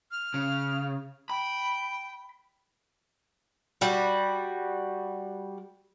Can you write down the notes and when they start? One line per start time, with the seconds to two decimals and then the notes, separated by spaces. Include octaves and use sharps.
0.11 F6
0.34 C#3
1.30 G5 B5
3.81 G3 F#4